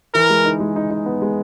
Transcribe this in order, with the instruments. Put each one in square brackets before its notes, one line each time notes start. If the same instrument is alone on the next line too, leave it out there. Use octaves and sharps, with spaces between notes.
[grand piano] E3 [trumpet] A#4
[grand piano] G#3
D#4
G#3
D#4
D#4
B3
G#3